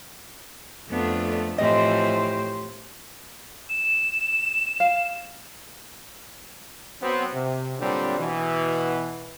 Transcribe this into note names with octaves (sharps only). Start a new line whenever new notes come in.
F2 A3 B3 D4
A2 E3 F3 C4 G4 C5 D#5
E7
F5
F#3 B3 C4
C3
A#2 D3 F#3 G3 C4 D4
B2 E3